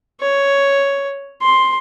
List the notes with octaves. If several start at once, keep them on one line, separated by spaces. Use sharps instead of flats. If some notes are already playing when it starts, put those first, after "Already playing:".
C#5
C6